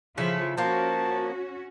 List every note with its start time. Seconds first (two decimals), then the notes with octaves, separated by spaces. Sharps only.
0.17 C#3 F3 E4 F4 A4
0.58 F3 A#3 C#4 F#4 A5